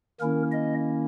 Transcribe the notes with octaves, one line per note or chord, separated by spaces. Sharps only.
D#3 A#3 C#4 E4 A#4
D#5